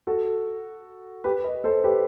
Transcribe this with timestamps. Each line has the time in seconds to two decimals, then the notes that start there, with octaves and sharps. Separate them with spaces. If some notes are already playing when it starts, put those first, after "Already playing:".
0.07 F#4 A4
1.24 G4 B4
1.44 B4 D#5
1.64 A4 C5
1.84 G4 B4